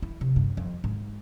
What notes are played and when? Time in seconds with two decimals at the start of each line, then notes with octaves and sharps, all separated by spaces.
0.02 E4
0.21 C3
0.36 G2
0.57 F2
0.84 G#2